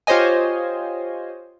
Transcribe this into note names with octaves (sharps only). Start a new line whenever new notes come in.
F4 G4 C5 C#5 D#5 G#5